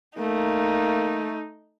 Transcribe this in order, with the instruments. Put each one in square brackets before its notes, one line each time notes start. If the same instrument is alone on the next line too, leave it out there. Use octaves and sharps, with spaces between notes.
[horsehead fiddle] A3 [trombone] A#3 [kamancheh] D#4